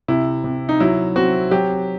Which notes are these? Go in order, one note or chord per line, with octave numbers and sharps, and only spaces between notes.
C3 E4
C3
D#4
F#3 E4
C4 F#4
F#3 G4